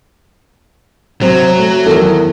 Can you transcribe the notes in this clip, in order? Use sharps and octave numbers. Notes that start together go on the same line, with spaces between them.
C3 F#3
A3
E2 D#3 A4